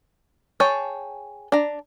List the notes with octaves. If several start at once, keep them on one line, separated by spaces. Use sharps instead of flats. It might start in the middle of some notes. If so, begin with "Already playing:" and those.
G#4 C#5 G5 A5
D4 A#5